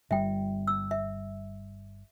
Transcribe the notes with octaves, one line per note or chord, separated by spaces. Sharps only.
G1 G3 E5 G5
E6
E5